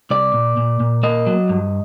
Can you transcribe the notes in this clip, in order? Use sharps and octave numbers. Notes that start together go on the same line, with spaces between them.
C2 D5
A#2
A#2
A#2
A#3 D#5
F#3
G2